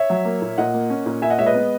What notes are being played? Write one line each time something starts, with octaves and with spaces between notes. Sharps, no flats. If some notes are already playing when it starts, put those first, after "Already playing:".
Already playing: C#5 E5
F#3
A#3
A#2
A#2 D#5 F#5
A#3
C#4
A#2
A#2 E5 G#5
D#5 F#5
G#3 C#5 E5
B4 D#5
B3